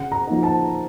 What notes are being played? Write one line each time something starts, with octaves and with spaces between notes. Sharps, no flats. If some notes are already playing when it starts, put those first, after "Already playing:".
Already playing: C#3 F#5
A#5
F3 A#3 D#4
A5